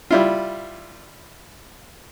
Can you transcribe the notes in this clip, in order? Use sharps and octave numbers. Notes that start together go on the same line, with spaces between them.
G3 E4 F4